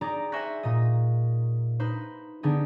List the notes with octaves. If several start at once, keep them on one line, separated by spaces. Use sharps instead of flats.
D#4 G4 G#4 D5 A#5
C5 E5 G#5 C#6 F#6 A#6
A#2 D#5
D#4 B4 C5
D3 B3 D4 D#4 G4 G#4